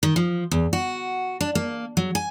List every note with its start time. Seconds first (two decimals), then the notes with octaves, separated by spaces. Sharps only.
0.03 D#3
0.16 F3
0.51 E2
0.73 F#4
1.41 D4
1.55 A#3
1.97 F#3
2.15 G#5